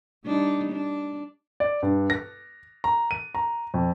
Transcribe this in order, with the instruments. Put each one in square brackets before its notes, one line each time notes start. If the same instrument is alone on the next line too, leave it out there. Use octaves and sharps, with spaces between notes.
[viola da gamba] G3 D4 D#4
D4
[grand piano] D5
G2
A#6
A#5
D#7
A#5
F2